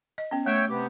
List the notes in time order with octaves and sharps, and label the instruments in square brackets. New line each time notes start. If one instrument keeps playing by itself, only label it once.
[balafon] D#5
B3 C#4
[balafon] A3 [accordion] C#5 E5 G5
[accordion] C3 B3 G4